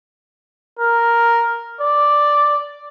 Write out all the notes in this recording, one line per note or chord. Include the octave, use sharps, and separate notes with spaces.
A#4
D5